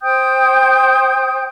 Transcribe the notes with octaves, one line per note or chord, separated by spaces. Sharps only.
C5 G5 D#6 G6